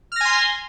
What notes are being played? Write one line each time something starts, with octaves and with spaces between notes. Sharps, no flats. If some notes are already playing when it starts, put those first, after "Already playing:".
G#5 C6 F6 A#6